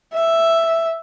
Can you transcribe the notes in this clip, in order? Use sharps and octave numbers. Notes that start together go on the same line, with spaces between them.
E5